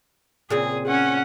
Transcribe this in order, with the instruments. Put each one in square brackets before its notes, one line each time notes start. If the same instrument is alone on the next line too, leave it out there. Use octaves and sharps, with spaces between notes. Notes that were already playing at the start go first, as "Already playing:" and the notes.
[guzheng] A#2 C#3 C4 [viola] G#4
[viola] C#4 [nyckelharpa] F#5